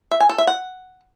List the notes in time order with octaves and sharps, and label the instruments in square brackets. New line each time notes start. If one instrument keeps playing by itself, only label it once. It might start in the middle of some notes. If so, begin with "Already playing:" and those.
[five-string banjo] E5
G#5
A4
E5
F#5